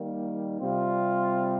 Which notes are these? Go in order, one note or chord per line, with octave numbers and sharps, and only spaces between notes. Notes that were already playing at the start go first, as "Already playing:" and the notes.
Already playing: D#3 G3 A#3
C3 G3 C4 F4